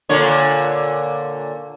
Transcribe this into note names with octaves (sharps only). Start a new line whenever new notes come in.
A#2 D3 C#5